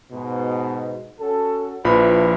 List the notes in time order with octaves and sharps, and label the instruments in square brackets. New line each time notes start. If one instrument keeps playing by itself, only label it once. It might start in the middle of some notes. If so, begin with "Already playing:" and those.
[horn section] G#2 B2
C#4 F#4 A4
[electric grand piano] A#1 F3 B5 [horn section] E4 B4